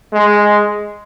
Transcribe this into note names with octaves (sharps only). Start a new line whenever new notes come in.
G#3